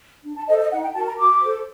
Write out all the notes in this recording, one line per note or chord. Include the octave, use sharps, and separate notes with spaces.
D4
A5
A4 C5 D#5
D#5
D#4 F#5
G5
F#4 A#4 A5
A#5
F#4 D6
A4 C5